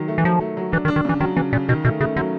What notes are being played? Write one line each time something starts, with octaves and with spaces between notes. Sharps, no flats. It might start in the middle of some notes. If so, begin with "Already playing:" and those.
Already playing: D#3 F#3
A3
E3
F3 F#3
A3
F#3
E3 D4
D#3
D4
D#3
C#3 E3
D#3 F#3
C#3 E3
A#2 C#3
B2 D#3
B2 A3
C#3 A3
D3 F#3